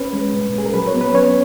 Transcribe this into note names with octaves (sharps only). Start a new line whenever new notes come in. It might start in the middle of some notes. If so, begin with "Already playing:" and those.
Already playing: C#4 B4
G#3
A#2
C#4 G#4
A#4
F#3 B4
C#5
B3
B4
C#4 C#5